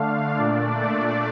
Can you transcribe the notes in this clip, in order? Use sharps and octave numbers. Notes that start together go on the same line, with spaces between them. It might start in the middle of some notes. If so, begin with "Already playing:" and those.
Already playing: D3 A3 D4 F5
A#2 A3 D4 D5
A#2 A3 D4 D5